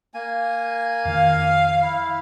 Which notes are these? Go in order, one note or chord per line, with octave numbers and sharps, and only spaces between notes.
A#3 G#5
F2 D#3 F5
E4